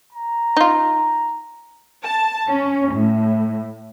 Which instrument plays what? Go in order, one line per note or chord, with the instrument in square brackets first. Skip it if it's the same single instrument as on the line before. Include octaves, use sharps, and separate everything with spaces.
[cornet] A#5
[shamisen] D#4 F4
[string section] A5
C#4
A2